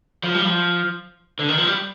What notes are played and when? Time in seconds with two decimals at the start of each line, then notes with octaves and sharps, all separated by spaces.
0.24 F3
0.35 G3
0.45 F3
1.39 D3
1.49 D#3
1.58 F3
1.67 G3